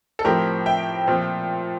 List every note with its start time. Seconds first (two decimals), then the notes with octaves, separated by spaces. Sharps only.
0.19 A4
0.24 A2 F3 C4 G4 A#4
0.66 E5 G5
1.07 A#2 F3 C4